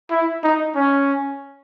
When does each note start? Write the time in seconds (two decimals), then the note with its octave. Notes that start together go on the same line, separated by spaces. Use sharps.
0.11 E4
0.43 D#4
0.76 C#4